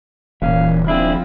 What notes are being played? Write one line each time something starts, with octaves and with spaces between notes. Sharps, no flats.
D#1 A#2 E3 C#4 F5
F3 C4 D4 E4 G#4